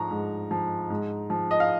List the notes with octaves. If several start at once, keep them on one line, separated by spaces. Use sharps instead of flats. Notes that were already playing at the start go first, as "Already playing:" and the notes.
Already playing: G#2 F3 A#5 C#6
G#2
F3
G#2
F3
D#5
F5